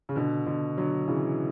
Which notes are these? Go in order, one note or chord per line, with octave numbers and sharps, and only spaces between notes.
C#3
B2 D3
B2 D3
D3 F#3
C#3 E3